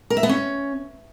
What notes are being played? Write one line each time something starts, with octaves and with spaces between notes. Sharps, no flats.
A#4
E5
B3
C#4